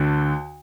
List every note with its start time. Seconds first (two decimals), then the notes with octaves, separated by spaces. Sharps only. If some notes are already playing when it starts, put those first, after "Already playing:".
Already playing: D2 D3